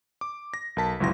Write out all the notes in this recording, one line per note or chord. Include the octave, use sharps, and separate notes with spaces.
D6
A#6
B1 A#4 A5 B6
G1 C#2 F#3 E4 C6 A#6